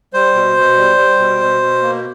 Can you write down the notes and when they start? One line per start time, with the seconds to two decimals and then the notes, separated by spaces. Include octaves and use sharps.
0.13 G3 C5
0.35 B2
0.57 B2
0.77 G3
0.98 G3
1.19 B2
1.41 B2
1.62 B2
1.82 A#3